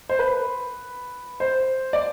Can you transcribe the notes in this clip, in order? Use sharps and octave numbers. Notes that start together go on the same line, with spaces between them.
C5
B4
C5
D5